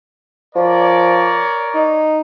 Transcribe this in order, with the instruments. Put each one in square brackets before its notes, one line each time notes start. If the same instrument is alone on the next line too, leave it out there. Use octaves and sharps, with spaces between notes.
[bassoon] F3 [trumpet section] A#4 C#5 D5
[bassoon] D#4